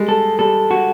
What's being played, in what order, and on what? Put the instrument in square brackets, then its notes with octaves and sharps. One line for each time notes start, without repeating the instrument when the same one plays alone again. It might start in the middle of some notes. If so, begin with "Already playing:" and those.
Already playing: [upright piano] G3 G#3
[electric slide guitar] A4
[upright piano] G3 [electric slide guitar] A4
[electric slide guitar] F#4